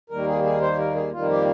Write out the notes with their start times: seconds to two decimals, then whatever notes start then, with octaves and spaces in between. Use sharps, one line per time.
0.10 D#2 D#3 G3 A#3 A#4
0.27 G#4
0.44 G#4
0.62 C5
0.78 A#4
0.95 G#4
1.11 F2 D#3 G3 A#3 F4
1.29 G4